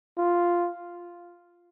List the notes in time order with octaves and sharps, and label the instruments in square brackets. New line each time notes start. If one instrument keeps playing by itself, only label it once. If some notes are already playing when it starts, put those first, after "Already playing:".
[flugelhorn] F4